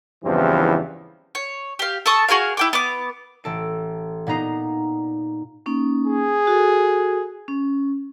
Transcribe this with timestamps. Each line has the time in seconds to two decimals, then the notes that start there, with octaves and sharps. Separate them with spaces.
0.24 E2 G2 C#3 E3 F3 C4
1.35 C#5
1.79 G4 F5
2.06 A4 A5 C#6 D#6
2.28 F#4 G#4 A#4 F5
2.57 E4 G5 D6
2.73 B3 D6
3.44 A1 A4 D7
4.27 A#2 B3 D#4 A#5 C7
5.66 A#3 C#4 D#4
6.07 G#4
6.47 F#4 A4
7.48 C#4